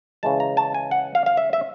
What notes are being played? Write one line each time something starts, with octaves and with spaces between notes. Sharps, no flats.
C#3 E3 G#3 A5
A#5
A5
G#5
F#5
F5
F5
E5
E5